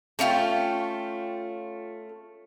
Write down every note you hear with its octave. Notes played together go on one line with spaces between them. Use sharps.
A3 C#4 F4 G5